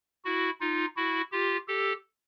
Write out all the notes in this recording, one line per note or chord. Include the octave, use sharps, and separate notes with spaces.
E4 F#4
D#4 F4
E4 F#4
F4 G4
G4 A4